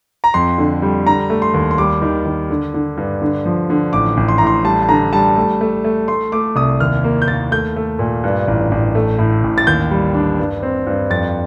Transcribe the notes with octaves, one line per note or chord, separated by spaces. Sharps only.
A#5
F2 C6
D3
G3
D3 A#5
A3
C6
D#2
C6
G3 D6
D#3
D#3
D3
D3
G2
D3
F3
D3
A1 D6
A1
C6
A2 A#5
C6
G3 A5
A5
D3 A#5
G3 A5
A3
A3
A3
A3 C6
A3 D6
C2 D#6
D#2 F6
A#3
G6
D#2 A6
A3 G6
A3
A#2
G2
A1
A1
A3
A2
A1
A6
D#2 G6
G3
D4
G2
C4
G2
F2 A6